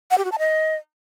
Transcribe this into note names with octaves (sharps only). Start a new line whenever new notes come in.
F#5
G4
F#4
A5
D#5